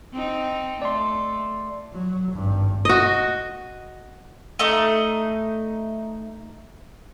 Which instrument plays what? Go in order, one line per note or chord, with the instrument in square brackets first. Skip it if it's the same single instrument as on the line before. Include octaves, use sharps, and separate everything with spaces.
[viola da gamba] C4 D#4
[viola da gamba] A3 [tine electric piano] D5 C6
[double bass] F#3
G#1 G2
[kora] F#4 D#5
[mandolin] A3 D#4 D#5